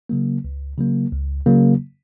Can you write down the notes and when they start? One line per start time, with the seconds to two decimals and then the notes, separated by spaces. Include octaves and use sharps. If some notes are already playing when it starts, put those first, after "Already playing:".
0.09 C#3 F#3 A#3
0.44 C#2
0.78 C#3 F#3 A#3
1.12 C#2
1.46 C#3 F#3 A#3